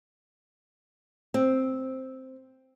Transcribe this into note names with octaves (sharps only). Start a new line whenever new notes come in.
C4